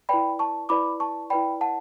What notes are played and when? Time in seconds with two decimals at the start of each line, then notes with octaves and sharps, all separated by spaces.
0.09 E4 B4 D5 G5 B5
0.39 A5 C#6
0.69 E4 B4 D5 B5 D6
1.00 A5 C#6
1.30 E4 B4 D5 G5 B5
1.61 F#5 A5